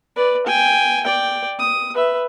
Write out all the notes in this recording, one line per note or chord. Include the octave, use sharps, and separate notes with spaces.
B4 D5
G5 G#5
D5 G5
D#6
B4 E5